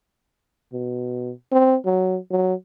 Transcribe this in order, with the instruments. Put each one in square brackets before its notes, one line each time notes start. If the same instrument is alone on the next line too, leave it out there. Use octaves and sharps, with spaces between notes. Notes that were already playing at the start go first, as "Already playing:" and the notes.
[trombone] B2
C4
F#3
F#3